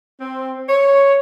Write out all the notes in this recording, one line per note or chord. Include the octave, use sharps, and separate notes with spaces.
C4
C#5